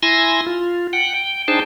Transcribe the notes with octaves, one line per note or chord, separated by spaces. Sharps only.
E4 G#5 C6 E6 A#6
F4
F#5 G5
G5
D4 D#4 G#4 C5 G5 A5